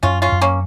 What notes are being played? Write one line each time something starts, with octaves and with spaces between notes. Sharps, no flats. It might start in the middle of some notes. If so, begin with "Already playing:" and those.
F#2 C#4 F4
C#4 F4
F#2
A#3 C#4